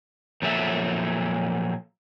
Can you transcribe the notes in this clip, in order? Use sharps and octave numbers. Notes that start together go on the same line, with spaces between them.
A#2 F3 F#3 A4 E5